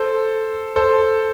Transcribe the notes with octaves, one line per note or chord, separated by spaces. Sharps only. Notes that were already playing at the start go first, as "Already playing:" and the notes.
Already playing: A4 C5
A4 C5